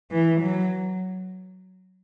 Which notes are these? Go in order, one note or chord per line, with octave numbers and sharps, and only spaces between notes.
E3
F#3